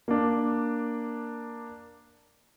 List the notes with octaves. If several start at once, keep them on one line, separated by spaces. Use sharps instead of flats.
A#3 D4